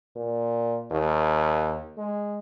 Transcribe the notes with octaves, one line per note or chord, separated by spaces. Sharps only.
A#2
D#2
G#3